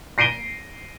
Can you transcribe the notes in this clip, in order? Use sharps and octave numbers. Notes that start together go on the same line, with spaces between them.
A#6 C7 D7 D#7 G7